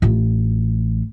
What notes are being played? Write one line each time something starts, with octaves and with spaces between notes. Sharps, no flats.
A1 F4